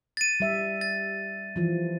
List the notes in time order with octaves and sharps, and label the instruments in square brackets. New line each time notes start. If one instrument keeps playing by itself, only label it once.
[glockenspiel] A6 D#7
[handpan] G3 E5
[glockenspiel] A6
[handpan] E3 F3